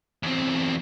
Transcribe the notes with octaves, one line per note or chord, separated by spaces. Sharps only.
E2 C4